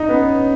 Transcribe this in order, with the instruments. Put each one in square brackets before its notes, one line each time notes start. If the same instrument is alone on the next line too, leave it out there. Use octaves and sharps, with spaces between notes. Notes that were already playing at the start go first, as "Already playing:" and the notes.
Already playing: [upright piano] D#4
[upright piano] B3 [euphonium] C#4